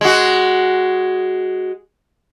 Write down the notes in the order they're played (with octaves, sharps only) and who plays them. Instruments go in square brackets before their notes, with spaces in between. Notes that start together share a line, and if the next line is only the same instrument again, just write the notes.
[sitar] G#3 F#4